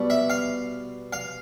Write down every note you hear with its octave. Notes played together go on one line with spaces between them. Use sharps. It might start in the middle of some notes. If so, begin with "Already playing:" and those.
Already playing: B2 G3
E5
F5
F5